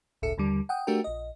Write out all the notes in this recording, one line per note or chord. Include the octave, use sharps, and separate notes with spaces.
G1 C#2 A2 A4 E5 C#7
D#2 D3 G3
F#5 G5 D#6
A3 D4 F#4 G4 A#4 G5
A#1 D#5